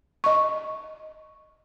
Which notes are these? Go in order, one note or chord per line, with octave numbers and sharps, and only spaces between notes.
D#5 C#6